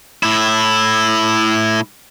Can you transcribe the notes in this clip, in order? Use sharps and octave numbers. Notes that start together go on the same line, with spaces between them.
A2 E4